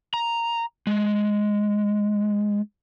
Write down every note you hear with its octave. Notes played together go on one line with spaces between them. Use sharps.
A#5
G#3